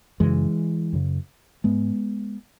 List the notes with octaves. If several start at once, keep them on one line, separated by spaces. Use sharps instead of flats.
F#2 C#3 E3 G#3
F#2 C#3
G#2 G#3 B3